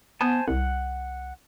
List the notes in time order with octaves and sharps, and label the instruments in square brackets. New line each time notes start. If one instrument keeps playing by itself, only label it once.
[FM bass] B3 [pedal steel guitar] C5 G#5 A5
[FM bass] C2 [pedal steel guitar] F#5